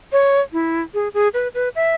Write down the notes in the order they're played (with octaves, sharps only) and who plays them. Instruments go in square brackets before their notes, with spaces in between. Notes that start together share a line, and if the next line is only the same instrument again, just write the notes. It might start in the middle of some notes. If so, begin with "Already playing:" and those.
[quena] C#5
E4
G#4
G#4
B4
B4
E5